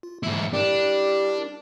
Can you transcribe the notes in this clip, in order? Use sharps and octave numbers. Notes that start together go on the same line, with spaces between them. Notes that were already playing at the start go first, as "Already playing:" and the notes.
F4
G#2 D3 E3 G3 E4
G3 D4 E4 G4 A#4